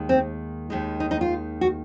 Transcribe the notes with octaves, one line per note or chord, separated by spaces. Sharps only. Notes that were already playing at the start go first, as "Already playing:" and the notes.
Already playing: D#2 D#3 G#3
C4
D#2 D#3 G#3
D#4
D#4
F4
F#4